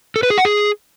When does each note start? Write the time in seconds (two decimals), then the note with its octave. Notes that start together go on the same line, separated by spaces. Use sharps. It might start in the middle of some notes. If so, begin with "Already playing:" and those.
0.16 A4
0.23 B4
0.30 G#4
0.38 F#5
0.45 G#4